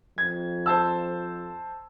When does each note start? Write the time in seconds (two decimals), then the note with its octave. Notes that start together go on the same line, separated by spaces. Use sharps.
0.18 F2 G#6
0.66 C5 A5 E6